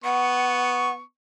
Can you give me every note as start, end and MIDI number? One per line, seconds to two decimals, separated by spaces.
0.04 1.00 59
0.04 0.93 78
0.04 1.00 85